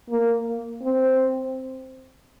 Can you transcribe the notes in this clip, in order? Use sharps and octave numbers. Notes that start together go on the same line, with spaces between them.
A#3
C4